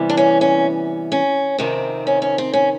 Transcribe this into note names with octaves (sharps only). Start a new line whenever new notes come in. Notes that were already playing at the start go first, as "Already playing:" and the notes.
Already playing: C3 E3 G3 B3
D4
C#4
C#4
C#4
F2 C3 D#3 C4
C#4
C#4
C4
C#4